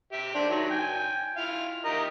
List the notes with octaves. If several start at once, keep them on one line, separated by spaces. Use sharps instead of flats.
G4 E5
D4 C5
D#3 F#3
G5 G#5
E4 F4 F5
G4 A#4 D#5